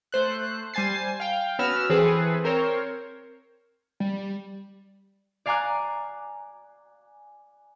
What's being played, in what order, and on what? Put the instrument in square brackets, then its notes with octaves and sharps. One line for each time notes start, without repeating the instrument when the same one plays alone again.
[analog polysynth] A3 C5 F#6
G3 C5 G#5 A6 C7
F5 G5
B3 C#4 F#4 B4 E6 F6
E3 C4 G#4 A4 B4
C4 A#4 C5 C#5
[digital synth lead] G3
[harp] D5 F5 G#5 A#5 D6 F#6